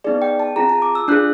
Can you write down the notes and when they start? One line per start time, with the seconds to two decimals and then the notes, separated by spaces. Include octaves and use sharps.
0.04 B3 D#4 G#4 D5
0.22 G5
0.40 A5
0.56 C4 F4 G#4 A#5
0.69 A5
0.82 D6
0.95 E6
1.08 D4 F4 G#4 F#6